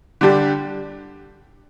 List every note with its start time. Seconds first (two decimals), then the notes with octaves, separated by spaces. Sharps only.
0.21 D3 G3 D4 G4